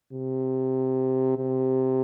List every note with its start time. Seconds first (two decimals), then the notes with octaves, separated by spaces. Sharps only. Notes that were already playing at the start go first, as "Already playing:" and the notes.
0.12 C3
1.37 C3